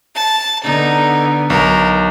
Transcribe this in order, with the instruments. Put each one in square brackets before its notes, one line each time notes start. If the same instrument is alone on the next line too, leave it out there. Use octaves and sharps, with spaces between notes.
[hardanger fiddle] A5
[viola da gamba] D3 B3 [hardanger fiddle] D#4
[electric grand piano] B1 [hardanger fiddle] A#4